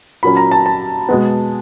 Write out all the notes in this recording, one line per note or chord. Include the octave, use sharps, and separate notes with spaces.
A#2 F#3 A#3 C#4 B5
A#5
A5
A5
B2 G#3 B3